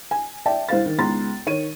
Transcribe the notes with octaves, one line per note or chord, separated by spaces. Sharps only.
G#5
D5 E5 G5 A5
C2 C5 F5 A6
D#3
C#2 G#2 B3 A#5 C6 A6
D#3 C#5 D#7